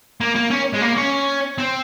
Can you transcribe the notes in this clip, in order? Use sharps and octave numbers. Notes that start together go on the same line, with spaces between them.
A#3
A#3
C#4
G#3
A#3
C#4
C4